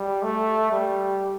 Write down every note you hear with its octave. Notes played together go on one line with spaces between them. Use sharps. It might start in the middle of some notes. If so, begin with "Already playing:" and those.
Already playing: G3
A3
G3